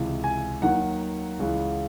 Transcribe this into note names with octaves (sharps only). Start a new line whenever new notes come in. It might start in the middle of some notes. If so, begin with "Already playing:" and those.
Already playing: C#2 C3 E3
G#5
D#2 D#3 F#3 F#5
C#2 C#3 E3